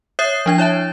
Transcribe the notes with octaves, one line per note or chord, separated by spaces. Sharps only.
C#5 E5 D#6 G6 C7
F3 D4 G#6
E4 C#5 E5 A5